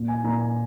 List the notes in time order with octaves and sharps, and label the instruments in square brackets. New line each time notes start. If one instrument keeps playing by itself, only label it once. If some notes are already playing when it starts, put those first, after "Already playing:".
Already playing: [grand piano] A#2
G#5
A#2 A#5
G#5